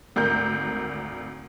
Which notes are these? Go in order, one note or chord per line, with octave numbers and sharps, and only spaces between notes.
G#1 D2 A#4 G6